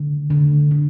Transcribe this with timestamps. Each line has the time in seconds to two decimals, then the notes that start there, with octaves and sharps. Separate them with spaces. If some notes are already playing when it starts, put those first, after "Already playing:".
Already playing: D3
0.30 D3
0.71 D3